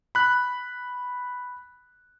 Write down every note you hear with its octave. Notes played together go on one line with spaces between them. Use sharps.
B5 F#6